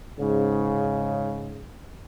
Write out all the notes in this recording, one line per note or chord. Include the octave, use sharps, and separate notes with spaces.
G#2 C#3